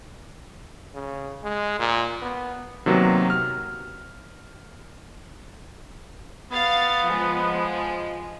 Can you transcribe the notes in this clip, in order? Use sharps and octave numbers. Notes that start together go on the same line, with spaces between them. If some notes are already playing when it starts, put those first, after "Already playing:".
C#3
G#3
A#2
B3
C3 D#3 F#3 A#3 B3
F6
B3 F5 A6
F3 G#3